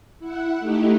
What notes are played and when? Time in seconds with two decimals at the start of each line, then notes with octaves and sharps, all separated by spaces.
0.19 E4 F#5
0.59 A3 D#4 E4 G4